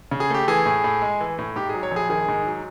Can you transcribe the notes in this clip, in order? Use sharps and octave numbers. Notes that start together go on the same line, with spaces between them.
C#3
G#4
A3 G4
E3 G#4
A2
A2
G#3
E3
A2
G#2 G4
G#4
F#3
C#5
A#1 G#4
D#3 G#4
G#2
F#3